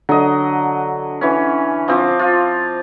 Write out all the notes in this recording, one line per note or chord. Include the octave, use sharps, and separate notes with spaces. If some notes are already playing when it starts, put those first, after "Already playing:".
D3 F#3 D#5
E3 C#4
F3 C4 D6
F4